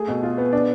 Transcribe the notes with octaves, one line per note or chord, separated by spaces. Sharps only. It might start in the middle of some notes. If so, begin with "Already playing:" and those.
Already playing: A3 G#4
B2
F4
B3
D4